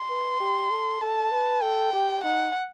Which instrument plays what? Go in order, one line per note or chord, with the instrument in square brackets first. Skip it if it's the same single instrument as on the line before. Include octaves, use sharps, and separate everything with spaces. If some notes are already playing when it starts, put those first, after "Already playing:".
Already playing: [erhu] C6
[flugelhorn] B4
G4
A4
[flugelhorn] A4 [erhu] A5
[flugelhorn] B4
[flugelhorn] A4 [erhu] G5
[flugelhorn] G4
[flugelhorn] D#4 [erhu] F#5